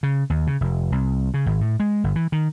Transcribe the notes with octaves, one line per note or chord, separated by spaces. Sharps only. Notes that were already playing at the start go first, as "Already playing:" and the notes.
C#3
D#2
C#3
F1
C2
C#3
G#1
A2
G#3
G1
E3
D#3